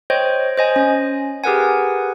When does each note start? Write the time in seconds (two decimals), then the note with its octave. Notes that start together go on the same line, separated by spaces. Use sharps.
0.10 C5 C#5 D#5 G5
0.57 C5 D#5 G#5
0.76 C#4
1.44 G4 G#4 A#4 B4 F#5 G#5